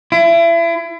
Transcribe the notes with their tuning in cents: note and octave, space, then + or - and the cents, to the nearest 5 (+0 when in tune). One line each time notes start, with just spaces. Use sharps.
E4 +35